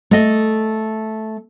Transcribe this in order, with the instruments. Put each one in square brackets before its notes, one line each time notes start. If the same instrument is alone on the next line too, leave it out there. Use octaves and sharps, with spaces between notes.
[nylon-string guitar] A3 D#5